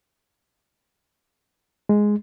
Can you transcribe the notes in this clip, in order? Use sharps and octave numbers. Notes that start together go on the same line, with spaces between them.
G#3